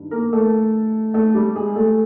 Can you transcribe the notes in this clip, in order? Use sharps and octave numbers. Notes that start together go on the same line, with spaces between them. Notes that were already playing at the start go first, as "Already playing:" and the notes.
Already playing: G2 D#3
A#3 A#4
A3 A4
A3 A4
G3 G4
G#3 G#4
A3 A4